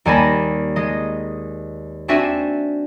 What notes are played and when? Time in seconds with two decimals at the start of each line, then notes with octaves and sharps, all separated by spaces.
0.05 D#2 G3 G#5 A5 B5 A#6
0.76 G#3 D#5
2.08 C4 D4 F#4 E5 G#5